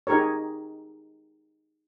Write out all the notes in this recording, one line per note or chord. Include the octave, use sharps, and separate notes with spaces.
D#4 G4 G#4 A#4 C#5